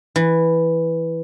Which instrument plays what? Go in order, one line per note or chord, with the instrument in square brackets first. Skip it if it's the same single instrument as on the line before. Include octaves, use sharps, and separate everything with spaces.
[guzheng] E3